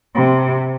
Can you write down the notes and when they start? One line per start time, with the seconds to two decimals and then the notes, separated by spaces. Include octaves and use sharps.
0.15 C3